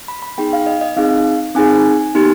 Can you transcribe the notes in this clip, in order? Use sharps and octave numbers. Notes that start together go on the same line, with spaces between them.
B5
B5
B3 D#4 G#4 G5
F5
D#5
D#5
C4 D#4 G#4 F5
C4 D#4 G#4 G#5
B3 D#4 G4